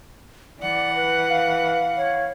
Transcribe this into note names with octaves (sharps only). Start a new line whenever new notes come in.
E3 D5 F#5
B4
F5
C#5